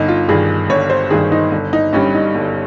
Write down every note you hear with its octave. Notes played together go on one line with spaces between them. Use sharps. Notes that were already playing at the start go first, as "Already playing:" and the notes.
Already playing: G1 D#4
F4
G2 D#3 G#4
G1 C#5
C5
G2 D#3 G#4
D#4
G1
D#4
G2 G3 C#4
D#4
G1